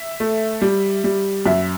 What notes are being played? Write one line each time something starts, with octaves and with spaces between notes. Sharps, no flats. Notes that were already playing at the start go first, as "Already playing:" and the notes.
Already playing: E5
A3
G3
G3
F#2 E5